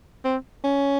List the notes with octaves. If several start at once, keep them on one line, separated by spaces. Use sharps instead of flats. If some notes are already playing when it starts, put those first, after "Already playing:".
C4
C#4